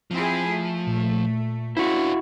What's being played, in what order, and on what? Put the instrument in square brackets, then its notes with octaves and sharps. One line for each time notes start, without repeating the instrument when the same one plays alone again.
[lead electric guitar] F3 [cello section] C4 E4 G#4
[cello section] A3
[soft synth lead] A#2
[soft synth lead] C#4 [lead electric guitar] D4 C5 [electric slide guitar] E4 F#4